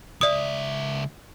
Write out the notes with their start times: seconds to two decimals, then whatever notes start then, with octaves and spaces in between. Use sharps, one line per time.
0.21 C#2 D5 E5 D#6